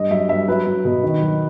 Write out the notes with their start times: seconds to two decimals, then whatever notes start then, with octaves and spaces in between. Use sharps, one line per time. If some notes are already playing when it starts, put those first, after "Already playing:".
Already playing: G2 D#5
0.11 F#3 E5
0.29 G2 E5
0.48 F#3 B4
0.67 F#3
0.85 B2
1.03 D#3
1.22 F#3